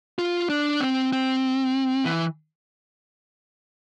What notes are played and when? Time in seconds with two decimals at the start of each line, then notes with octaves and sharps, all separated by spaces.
0.19 F4
0.50 D4
0.80 C4
1.13 C4
2.05 E3